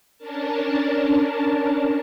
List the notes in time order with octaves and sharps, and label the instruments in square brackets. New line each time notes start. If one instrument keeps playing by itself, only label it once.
[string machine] C#4 D4 A#4 A5